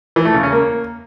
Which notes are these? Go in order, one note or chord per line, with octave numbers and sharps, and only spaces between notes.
E3
A3
C#3
C#4
A#3